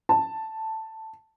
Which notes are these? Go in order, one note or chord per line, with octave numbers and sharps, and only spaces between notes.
A5